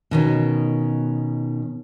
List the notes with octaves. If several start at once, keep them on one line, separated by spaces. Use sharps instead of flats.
B2 D#3 C#4